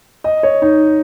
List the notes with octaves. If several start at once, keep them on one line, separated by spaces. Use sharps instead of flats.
D#5
C#5
D#4